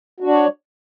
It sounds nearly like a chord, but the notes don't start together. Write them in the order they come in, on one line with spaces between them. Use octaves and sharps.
F#4 D4 D5 C#5